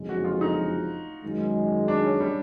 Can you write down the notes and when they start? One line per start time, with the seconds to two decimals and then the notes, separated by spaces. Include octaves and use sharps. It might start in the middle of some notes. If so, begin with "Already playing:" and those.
Already playing: F#1 F2 D3 F3 G#3
0.09 F#4
0.24 F4
0.41 D#4
1.23 F#2 D#3 G#3
1.88 D4
2.04 C#4
2.20 G3